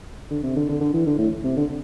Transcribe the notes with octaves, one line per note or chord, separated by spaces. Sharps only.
D3
C3
D3
D3
D3
E3
D3
A2
C3
D3